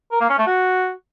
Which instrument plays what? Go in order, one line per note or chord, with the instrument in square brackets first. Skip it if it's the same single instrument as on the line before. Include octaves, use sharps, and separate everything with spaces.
[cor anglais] A#4
A#3
C#4
A3
F#4